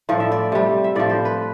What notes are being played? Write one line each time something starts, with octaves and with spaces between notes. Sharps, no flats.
A2 F3 D5
E5
D5
C3 G3
E5
A2 F3 D5
C5
B4